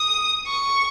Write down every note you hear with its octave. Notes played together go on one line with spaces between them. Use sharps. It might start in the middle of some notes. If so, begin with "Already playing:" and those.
Already playing: D#6
C#6